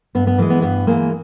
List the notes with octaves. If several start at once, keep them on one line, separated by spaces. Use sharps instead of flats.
G2 B3
B3
E3 G#3 A#3
B3
G2 B3
E3 G#3 A#3